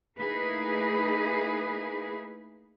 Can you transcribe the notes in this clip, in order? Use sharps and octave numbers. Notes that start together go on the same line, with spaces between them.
A3 A#3 D#4 E4 G#4 B4